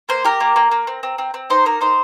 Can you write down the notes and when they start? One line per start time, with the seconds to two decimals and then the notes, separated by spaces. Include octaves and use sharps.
0.09 A#3 C5
0.25 G4 A#4
0.40 A#3
0.56 A#3
0.71 A#3
0.87 C4
1.03 C4
1.18 C4
1.34 C4
1.50 D#4 C5
1.65 A#3 A#4
1.81 D#4 C5